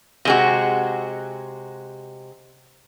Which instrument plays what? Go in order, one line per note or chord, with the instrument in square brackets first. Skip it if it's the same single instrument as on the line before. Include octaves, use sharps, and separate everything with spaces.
[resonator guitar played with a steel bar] C3 G#3 F#4